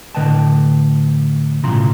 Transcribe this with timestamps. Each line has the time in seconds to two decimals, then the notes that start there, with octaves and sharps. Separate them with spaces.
0.15 A2 D3 B4 D#5 G5 A5
1.63 B1 A2 C#3 F3 A#5 C6